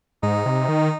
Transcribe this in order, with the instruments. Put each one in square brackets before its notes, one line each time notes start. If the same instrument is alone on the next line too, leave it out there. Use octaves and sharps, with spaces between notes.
[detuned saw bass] G#2 [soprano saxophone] D#4
[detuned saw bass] C3
D#3